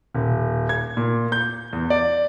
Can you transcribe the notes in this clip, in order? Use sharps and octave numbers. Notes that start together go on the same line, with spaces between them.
D#1
G#6
A#2
G6
E2
D5